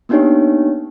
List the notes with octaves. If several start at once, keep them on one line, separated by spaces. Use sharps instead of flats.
A#3 B3 D4 D#4 G4 C#5